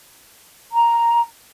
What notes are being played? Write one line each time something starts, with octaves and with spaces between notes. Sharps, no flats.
A#5